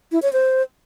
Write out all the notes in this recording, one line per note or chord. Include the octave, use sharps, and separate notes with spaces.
E4
C#5
C5